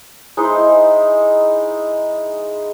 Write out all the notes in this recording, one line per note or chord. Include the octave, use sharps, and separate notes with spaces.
G#3 D#4 E4 C5